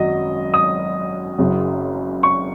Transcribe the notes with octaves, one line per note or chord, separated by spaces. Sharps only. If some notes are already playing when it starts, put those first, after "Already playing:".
Already playing: G#1 F#2 F#3 D#5
D#6
F#1 F#2 C#3 F#3
C#6